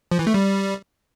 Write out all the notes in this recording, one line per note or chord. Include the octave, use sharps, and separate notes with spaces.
F3
E3
A3
G3